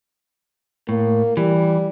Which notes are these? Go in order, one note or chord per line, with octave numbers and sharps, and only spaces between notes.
A2 A#3
E3 G3